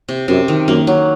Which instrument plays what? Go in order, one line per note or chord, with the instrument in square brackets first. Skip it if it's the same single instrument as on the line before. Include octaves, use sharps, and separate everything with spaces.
[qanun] C3
[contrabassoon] F#2 [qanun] C3
[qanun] D#3
[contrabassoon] F#2 [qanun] A#3
[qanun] F#3